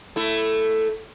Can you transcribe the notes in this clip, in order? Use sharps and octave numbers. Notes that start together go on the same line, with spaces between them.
A3 E4